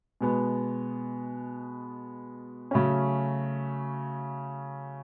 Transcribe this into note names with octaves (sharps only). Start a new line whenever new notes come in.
B2 G#3 B3
C#3 F#3 A3 C#4